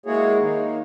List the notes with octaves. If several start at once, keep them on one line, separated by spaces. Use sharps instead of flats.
G#3 A#3 E4 F#4 G#4 C#5
D#3 A#3 D#4